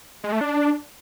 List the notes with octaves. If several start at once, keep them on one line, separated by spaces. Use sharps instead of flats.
G#3
A3
D4